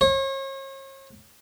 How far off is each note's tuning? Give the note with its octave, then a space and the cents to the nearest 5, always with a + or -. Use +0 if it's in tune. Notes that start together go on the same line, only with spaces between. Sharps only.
C#5 -40